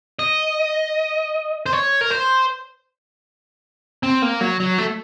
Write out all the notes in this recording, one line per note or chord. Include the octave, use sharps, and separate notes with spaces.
D#5
C5
C#5
A#4
C5
C4
A#3
F#3
F#3
A3